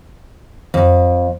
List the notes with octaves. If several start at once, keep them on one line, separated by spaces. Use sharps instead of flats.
F2